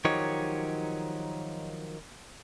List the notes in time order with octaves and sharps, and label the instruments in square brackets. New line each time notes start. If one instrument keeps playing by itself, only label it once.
[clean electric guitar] D#3 F3 F#3 D#4 G4 C#5